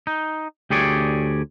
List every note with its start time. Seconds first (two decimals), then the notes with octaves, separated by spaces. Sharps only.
0.07 D#4
0.70 D2 G4 G#4 C#5 D5